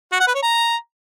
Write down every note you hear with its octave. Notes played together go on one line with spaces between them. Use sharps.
F#4
F#5
B4
C#5
A#5